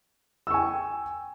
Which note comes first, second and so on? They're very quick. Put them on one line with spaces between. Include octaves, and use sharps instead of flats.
E6 C#6 G#5 G5